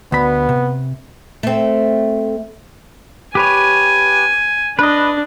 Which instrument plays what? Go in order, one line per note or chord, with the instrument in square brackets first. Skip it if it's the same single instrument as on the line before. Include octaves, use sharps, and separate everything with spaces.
[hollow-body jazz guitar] D2 B5 [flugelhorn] B3
[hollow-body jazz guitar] C3
[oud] A3 C4
[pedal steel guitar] G4 B4 C#5 [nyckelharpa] G#5
[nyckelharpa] D4 [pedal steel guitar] B4 D#5